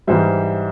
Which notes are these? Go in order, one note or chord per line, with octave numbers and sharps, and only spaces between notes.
G#2 E3 G3 C5 E5